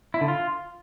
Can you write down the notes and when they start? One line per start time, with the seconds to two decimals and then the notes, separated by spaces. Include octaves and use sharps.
0.14 E4
0.21 D3
0.28 F4